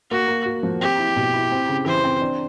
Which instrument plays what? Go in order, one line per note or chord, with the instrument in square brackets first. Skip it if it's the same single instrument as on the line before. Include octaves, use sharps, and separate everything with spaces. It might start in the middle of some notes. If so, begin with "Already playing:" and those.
[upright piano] A#3 [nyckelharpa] F#4
[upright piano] A#3
F#4
F3
[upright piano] C4 [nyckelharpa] G4
[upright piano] E4
B2
E4
C4
C#3
[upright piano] E3 [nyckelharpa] C5
[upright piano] C4
D4